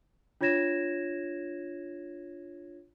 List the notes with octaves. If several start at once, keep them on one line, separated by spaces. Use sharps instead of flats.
D4 F4 C#5 G#6 A#6 E7